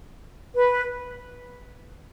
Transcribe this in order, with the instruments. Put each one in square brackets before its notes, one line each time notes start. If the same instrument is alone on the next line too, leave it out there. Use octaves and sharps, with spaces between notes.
[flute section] B4